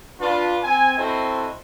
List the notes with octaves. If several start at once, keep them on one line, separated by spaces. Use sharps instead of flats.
D4 F4 B4
C4 G#5
C4 E4 F#4 A4 C5 D#5